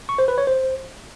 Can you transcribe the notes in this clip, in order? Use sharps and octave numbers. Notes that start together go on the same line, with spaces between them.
C#6
C5
B4
C#5
C5